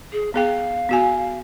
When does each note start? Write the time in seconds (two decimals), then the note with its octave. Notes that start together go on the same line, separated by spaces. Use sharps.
0.13 G#4
0.34 B3 G#4 F5 G5
0.89 B3 F#4 G#5